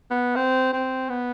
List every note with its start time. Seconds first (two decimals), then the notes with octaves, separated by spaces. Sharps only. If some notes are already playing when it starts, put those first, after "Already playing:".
0.10 B3
0.36 C4
0.73 C4
1.09 B3